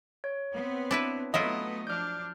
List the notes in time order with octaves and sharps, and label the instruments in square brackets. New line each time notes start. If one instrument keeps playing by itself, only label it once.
[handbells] C#5
[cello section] B3 C4
[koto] D4 E4 B4
[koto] F#3 E4 F4 [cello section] A3 B3 [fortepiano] D#5
[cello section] F3 D4 [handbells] F6 G6